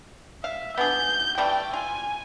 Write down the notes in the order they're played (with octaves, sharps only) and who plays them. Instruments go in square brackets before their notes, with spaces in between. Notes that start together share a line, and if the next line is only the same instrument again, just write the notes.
[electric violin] E5 [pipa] F5
[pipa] B3 D4 G#4 [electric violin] G6
[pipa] E3 G3 A3 [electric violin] G5
[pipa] F4 [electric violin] G#5